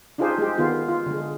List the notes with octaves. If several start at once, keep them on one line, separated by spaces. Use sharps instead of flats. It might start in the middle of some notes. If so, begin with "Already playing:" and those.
D4 D#4 F4 G4 G#4 C5
G#3 G4
D#3 B3 F4
F4
D3 G#3